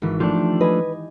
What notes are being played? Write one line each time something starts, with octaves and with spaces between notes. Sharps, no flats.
G#1 E3 B6
F3 A3 D4 G4
B4 D#5 G#5